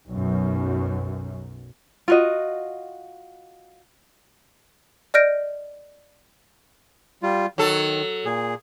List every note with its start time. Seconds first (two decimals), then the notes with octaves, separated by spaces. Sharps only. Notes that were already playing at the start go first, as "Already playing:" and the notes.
0.12 B1 F#2
2.08 F4 F#4 D#5
5.14 D5 D#5 F6 G6 A#6 D7
7.23 G3 F4
7.58 D#3 F#3 A4
8.25 A#2 G#4